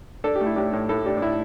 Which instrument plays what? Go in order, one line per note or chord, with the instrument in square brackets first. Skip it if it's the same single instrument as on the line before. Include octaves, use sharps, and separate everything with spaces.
[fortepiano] D4 A4
G4
A3
E4
A2 D4 G4
A2
A2 E4 A4
D4 G4
D4
A2 E4